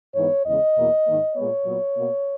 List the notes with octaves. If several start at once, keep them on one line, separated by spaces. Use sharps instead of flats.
G#2 E3 B3 C#5
E2 C#3 G#3 D#5
E2 B2 A#3
G#2 D#3 A#3
A#2 G#3 B3 C#5
A#2 F#3 B3
B2 A#3